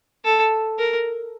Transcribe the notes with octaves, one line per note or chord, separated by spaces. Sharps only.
A4
A#4